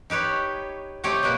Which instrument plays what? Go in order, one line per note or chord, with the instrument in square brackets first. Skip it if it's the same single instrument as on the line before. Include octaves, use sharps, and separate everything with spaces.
[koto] D#4 G4 B4 C#5
A3 C4 G4 C#5 D#5
B2 F#3 A#3 B4